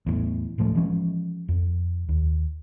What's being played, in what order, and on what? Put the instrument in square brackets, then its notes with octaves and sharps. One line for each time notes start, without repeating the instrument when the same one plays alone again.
[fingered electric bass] E2 A2
D1 A2 F3 A3
E3 F3 G#3 C#4
F2
D#2